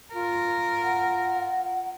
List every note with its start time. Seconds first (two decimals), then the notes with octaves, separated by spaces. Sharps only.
0.14 F4 A#4
0.83 F#5